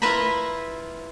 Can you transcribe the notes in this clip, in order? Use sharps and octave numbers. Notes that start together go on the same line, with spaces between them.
E4 F4 B4 E5 A#5 B5